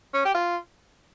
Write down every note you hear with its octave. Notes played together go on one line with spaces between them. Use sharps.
C#4
G4
F4